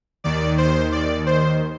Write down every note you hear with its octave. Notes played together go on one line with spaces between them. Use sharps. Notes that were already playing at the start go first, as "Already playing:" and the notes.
D#2 D#3 D5
C5
D5
C5